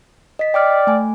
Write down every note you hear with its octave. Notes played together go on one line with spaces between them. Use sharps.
D#5 B6
D5 G5 D6 F6
A3 G#5